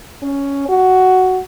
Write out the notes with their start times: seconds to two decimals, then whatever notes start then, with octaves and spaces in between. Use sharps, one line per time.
0.23 C#4
0.69 F#4